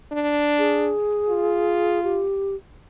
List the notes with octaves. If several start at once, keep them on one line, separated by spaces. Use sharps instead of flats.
D4
G#4
F4
G4